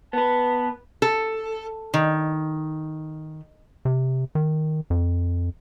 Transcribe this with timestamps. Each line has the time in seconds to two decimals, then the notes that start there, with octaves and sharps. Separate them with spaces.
0.13 B3 B4 A5
1.02 A4
1.94 D#3
3.85 C3
4.35 D#3
4.90 F2